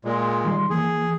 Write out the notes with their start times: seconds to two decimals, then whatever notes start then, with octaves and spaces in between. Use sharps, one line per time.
0.05 A#2 G#3
0.45 D#3 G3 C6
0.70 E3 A#3 G#4